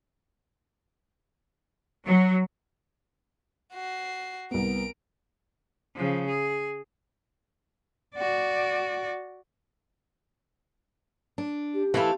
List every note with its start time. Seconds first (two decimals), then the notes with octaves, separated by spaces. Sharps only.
2.06 F#3
3.73 F#4 C7
4.51 C2 B3 A#4 D7
5.95 C#3 F3
6.28 G#4
8.16 F#4 D5
11.38 D4
11.74 G4
11.94 E3 A3 C4 E4 F5